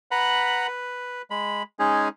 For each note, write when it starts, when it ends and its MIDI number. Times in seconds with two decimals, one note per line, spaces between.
0.11 0.67 71
0.11 0.67 78
0.11 0.67 82
0.11 0.67 83
0.67 1.22 71
1.30 1.63 56
1.30 1.63 83
1.79 2.08 56
1.79 2.08 61
1.79 2.08 63
1.79 2.08 68